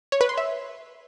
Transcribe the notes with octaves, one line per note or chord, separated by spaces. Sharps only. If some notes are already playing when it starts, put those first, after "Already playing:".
C#5
B4
C6
E5